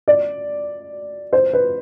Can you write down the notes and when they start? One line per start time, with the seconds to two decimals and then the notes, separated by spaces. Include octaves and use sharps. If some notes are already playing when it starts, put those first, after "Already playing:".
0.08 D5
1.33 C5
1.53 B4